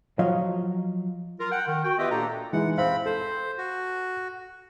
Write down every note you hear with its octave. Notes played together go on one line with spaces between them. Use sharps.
F3 F#3 F4 C#5 D#5 F5
F4 A#4
F#5 G5
D#3
F#4 G5
B3 F4 G4 B4 D#5 E5
A#2 A#3 D4 G4 A4 A#5
E3 G#3 D#4 F#5
C4 C5 F5 B5
A4 C5
F#4